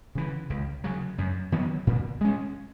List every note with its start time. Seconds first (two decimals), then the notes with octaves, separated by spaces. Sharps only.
0.15 C#3 E3
0.50 C#2
0.84 C#3 F#3
1.18 F#2
1.52 D#3 F#3 B3
1.87 A#2
2.21 G#3 C#4